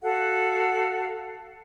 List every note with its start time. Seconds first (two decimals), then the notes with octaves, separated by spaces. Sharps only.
0.02 F#4 A4 F5 F#5